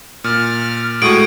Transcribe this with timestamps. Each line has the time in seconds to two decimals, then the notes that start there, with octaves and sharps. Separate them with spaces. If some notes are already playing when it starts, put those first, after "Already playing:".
0.24 A#2 F6
1.02 A2 G#3 A3 F#4 C#6 D#6 D7 F#7